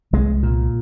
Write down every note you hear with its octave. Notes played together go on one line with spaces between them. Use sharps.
C2 G#3
A#2